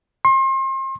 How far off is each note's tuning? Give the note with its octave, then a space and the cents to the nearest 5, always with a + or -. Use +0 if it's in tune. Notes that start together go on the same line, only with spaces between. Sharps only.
C6 +35